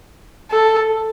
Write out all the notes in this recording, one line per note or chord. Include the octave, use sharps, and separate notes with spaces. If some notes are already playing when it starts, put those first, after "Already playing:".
A4